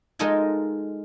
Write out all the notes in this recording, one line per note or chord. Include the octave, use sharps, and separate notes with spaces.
G#3 D#4 F4 A4 A#4 G#5